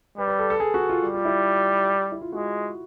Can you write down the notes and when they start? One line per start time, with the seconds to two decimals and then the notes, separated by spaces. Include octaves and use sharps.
0.17 G3 B4
0.28 B4
0.39 A4
0.50 A4
0.60 G#4
0.74 F#4
0.89 F4
1.04 G3
1.14 F4
1.25 E4
2.12 E4
2.21 F4
2.32 G#3 F#4